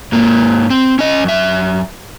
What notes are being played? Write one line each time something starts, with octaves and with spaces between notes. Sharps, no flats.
G#2 A#3
C4
C#4 D#5
F#2 E5